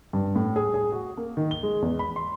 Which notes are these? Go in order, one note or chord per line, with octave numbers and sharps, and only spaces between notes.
G2
A2
G#4
G#4
F#4
A#3
D#3
G7
G#3
E2
B5
C6